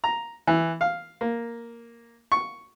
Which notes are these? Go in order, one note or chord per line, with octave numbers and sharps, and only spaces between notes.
A#5
E3
F5
A#3
C#6